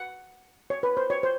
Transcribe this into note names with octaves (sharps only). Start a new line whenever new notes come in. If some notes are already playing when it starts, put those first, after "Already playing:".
Already playing: F#5
C#5
B4
C5
C#5
C5